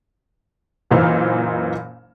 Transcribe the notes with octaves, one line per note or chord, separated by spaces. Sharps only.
F#1 A#2 E3 D#4 C5 F6